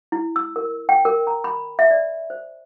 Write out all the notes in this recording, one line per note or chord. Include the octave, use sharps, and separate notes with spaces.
E4
E6
A#4
G5
A#4
A#5
B5
E5
D5
C5